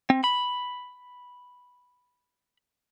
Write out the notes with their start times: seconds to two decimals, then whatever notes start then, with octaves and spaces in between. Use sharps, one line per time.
0.10 C4
0.24 B5